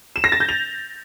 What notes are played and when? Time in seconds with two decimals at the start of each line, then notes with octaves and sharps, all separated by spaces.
0.16 E7
0.24 A#6
0.32 A6
0.40 G6
0.49 F7